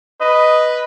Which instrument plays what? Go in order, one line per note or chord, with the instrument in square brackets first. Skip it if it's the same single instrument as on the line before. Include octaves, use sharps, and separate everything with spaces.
[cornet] B4 [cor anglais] D#5